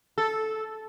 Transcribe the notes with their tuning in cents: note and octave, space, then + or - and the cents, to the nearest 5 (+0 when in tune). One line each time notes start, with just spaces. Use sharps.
A4 -10